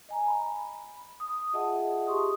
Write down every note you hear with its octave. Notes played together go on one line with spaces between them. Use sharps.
D#5 G#5 A#5
B5
D#6
F4 G#4 D#5 E5 F#5 A5
G4 C6 C#6 D#6